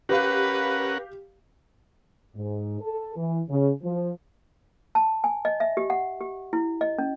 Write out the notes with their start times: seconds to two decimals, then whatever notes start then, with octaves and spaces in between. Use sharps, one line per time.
0.09 C#4 G4 A#4 B4 F5 F#5
2.36 G#2
2.81 A4
3.16 E3
3.49 C#3
3.83 F3
4.95 A5
5.24 G#5
5.45 D#5
5.60 E5
5.77 G4
5.90 F#5
6.21 G4
6.53 E4
6.81 D#5
6.98 C#4